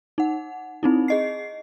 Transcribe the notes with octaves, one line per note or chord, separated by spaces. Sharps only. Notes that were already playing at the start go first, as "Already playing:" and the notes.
D#4 F#5
C4 D#4 E4
G#4 D#5 C7